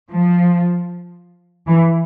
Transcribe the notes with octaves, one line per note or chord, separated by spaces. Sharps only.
F3
E3